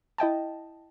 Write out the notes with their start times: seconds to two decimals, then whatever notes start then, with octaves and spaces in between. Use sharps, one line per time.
0.18 E4 D#5 G5 A5